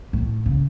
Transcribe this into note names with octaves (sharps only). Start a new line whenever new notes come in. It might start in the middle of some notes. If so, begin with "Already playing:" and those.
A2
C#3